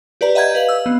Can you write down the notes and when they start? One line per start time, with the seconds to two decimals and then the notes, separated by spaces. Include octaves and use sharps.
0.21 G4 B4 D5 A#5
0.35 D#5 E5 F#5 A#5 G6 G#6
0.55 B4 F5 F#7
0.69 E6
0.86 B3